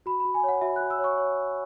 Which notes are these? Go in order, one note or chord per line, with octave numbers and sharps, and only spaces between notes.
F#4 B5
F#4 B5
G#5
C#5
F#5
F#4 E5
F#4 F#6
E6
C#5
C#6
C#5